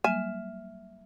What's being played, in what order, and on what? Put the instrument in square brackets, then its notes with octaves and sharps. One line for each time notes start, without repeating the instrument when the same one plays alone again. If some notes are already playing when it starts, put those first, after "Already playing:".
[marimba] F#3 G3 A#3 [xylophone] E5 F6 E7 [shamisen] G#5